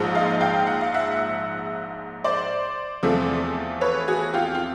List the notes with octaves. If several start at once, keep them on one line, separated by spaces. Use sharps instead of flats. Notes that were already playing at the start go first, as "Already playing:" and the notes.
Already playing: A#1 G#2 F3 G#3
D#5 F5
F5 G5
F#5
F5
E5 F#5
C5 D5
E2 C3 F3 A3
B4 C#5
F#4 G#4
F4 G4
F4